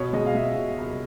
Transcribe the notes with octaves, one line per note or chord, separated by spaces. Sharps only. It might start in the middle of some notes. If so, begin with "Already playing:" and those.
Already playing: B2 C#5
G#3 D#5
F5
G#3 E5
B2
C2